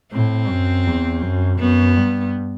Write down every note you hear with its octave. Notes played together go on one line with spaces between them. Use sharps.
A2 C4
F#2
E2
F#2
F#2 B3
G2